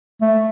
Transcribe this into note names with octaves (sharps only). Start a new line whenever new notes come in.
A3